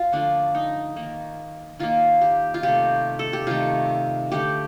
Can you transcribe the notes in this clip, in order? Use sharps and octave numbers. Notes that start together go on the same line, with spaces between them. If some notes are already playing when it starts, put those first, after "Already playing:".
Already playing: F4
D3 F3 A3 D4
D#4
D#3 A#3
D#3 A#3 F4
G4
F4
C3 D#3 A3 G4
A4
G4
C3 D#3 A3 F4
D3 A3 G4